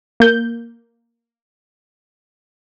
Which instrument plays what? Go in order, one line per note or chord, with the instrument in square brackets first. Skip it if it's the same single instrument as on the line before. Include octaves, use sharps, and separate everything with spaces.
[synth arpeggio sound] A#3 G6